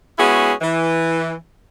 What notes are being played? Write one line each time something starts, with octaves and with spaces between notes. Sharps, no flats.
G#3 B3 C#4 E4 F#4 G#4
E3